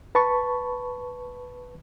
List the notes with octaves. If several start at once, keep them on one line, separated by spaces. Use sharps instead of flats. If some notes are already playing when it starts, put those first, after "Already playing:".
B4 A5 B5 C#6